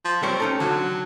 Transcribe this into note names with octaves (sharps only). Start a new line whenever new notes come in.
F3
G3 C4 A#4 C#5
C#4 D#4 A4
D3 F#3